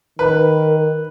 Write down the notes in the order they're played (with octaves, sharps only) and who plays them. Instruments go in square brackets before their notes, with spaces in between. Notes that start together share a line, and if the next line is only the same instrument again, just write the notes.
[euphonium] D#3 [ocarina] A#4 [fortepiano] B4